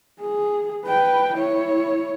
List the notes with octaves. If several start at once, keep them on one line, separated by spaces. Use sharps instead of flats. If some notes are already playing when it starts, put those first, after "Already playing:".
G#4
B4 G5
E4 C#5